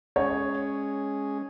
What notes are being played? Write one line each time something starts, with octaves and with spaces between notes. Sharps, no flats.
G#3 C#4 G#4 C#5